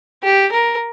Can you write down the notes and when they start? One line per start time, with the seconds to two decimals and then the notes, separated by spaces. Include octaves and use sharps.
0.23 G4
0.52 A#4